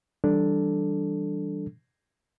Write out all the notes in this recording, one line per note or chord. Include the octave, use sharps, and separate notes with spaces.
E3 G3 D4 A4